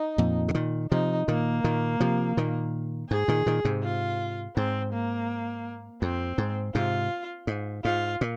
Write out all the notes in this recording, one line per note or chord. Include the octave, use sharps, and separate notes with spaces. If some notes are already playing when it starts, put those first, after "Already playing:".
Already playing: D#4
F2 A#2
C3
A#2 D#3
C3 F3 D#4
A#2 D#3 A#3
A#2 D#3
C3 F3
A#2 D#3
G#2 G#4
A#2 D#3
A#2 D#3
G#2 C3
F4
G#2 C4
A#3
F2 C4
G#2
G#2 C3 F4
G#2
G#2 F4
A#2